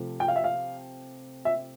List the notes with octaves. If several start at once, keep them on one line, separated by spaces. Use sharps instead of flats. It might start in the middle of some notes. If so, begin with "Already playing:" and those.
Already playing: C3 F3 A3
G5
F5
E5
F5
E5